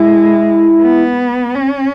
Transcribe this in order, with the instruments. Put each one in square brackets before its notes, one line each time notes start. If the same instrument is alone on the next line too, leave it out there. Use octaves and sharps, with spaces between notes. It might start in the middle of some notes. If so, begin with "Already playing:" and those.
Already playing: [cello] G#3 [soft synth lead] E4
[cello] B3
C#4